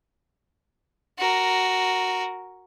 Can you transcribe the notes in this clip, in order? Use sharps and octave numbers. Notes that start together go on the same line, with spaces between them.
F#4 A#4